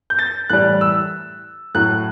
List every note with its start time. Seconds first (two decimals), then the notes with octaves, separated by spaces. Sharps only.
0.10 G6
0.19 A6
0.49 A2 E3 G3 F#6
0.81 E6
1.75 A2 F#3 F#6